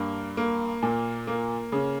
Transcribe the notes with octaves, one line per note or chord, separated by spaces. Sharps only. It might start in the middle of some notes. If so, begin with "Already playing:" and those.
Already playing: G2 A#3
A#3
A#2
A#3
C#3